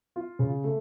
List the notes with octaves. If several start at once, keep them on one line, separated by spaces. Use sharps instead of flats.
F4
C#3
A3